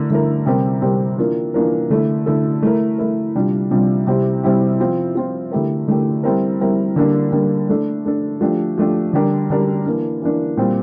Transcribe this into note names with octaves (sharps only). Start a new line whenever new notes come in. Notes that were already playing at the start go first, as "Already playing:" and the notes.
Already playing: D3 A3 E4 A#4
D3 A3 E4 A#4
C3 G3 C4 G4 A#4
C3 G3 C4 G4 A#4
E3 A#3 D4 F4 A#4
E3 A#3 D4 F4 A#4
D3 A3 E4 A4
D3 A3 E4 A4
A3 E4 A#4
A3 E4 A#4
C3 G3 D4 F4
C3 G3 D4 F4
C3 G3 C4 E4 G4
C3 G3 C4 E4 G4
F3 C4 F4
F3 C4 F4
D3 A3 E4 G4 A#4
D3 A3 E4 G4 A#4
G3 C4 E4 A#4
G3 C4 E4 A#4
D3 G3 A#3 D4
D3 G3 A#3 D4
A3 D4 A4
A3 D4 A4
F3 A3 D4 G4
F3 A3 D4 G4
D3 G3 D4 G4 A#4
D3 G3 D4 G4 A#4
E3 A#3 D4
E3 A#3 D4
A#2 G3 C4